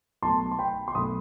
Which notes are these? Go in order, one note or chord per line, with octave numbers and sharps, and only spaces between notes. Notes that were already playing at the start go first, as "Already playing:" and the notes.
B1 B2 A3 A5 C6
C6
G5 B5
C6
B1 B2 A3 B5 D#6